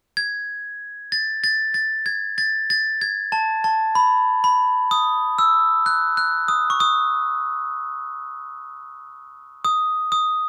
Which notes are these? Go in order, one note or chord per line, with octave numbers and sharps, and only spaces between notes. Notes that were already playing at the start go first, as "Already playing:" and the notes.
G#6
A6
A6
A6
G#6
A6
A6
G#6
A5
A5
B5
B5
D#6
E6
F#6
F#6
D#6
C#6
D#6
D#6
D#6